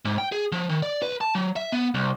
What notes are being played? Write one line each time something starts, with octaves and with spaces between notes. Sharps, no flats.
G#2
G5
G#4
F3
D#3
D5
B4
A5
F#3
E5
B3
C2